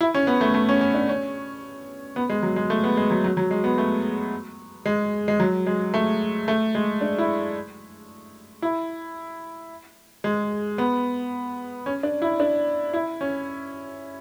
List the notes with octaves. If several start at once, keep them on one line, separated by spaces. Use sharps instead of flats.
E4
C#4
B3
A3
A3
C#4
C#4
D4
C#4
B3
G#3
F#3
G#3
A3
B3
G#3
F#3
F#3
F#3
G#3
B3
A3
G#3
G#3
F#3
G#3
A3
A3
G#3
D4
E4
E4
G#3
B3
C#4
D4
E4
D4
E4
C#4